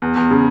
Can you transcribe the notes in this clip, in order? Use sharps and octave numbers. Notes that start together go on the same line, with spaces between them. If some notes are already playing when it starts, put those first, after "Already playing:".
E2
E2
C#3